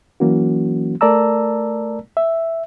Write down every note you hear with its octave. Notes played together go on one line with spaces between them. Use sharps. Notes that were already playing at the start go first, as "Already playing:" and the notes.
E3 F#3 A#3 C#4 F#4
A3 A#4 D5 A5 A#5 E6
E5